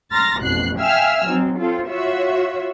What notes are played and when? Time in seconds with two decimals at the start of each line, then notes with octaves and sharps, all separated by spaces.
0.11 A#5 C6 F6 A6 A#6
0.41 A1 F2 B2 F#6 C7
0.78 E5 F5 G5 G#5 E6 F6
1.26 F#3 C4 D#4
1.57 C4 F4 A4
1.89 F4 F#4 C#5 E5